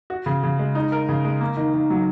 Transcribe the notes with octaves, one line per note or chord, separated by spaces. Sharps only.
F#4
C#3
C#3
G#3
D#4
A#4
C#3
G#3
A#3
D#3
D#3
F#3